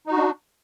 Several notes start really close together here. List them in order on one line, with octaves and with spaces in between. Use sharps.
D#4 F#4 D4